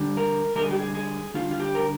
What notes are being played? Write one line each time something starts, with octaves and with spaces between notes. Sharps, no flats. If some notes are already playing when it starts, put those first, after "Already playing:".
Already playing: D3 G3
A#4
D3 G3 A#4
G#4
G4
G#4
G#4
D3 G3 F4
F4
G4
A#4